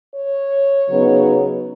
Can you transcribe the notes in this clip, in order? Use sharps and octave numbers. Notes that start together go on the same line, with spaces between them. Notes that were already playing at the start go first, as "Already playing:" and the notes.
C#5
C#3 F#3 B3 D#4